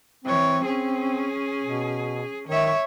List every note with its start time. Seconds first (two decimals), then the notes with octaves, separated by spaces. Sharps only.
0.24 E3 C4 C#5
0.64 C#4 G#4
1.62 B2
2.48 D#3 C#5 E5